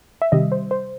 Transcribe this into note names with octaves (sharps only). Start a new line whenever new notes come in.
E5
C3 D#3 G3 D#5
C5
C5